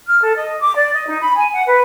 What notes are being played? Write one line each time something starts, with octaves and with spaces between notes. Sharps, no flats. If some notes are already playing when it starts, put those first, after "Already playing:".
F6
A4
D#5
D6
D5
D#5
D#4
B5
G#5
F#5
B4